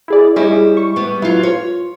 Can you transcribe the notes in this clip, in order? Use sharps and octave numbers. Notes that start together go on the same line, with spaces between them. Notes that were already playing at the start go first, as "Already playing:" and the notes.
E4 G#4 D5
G3 E4 G#4 C#5 D#5
C#6
G3 B3
F#3 E4 F4
F4 C#5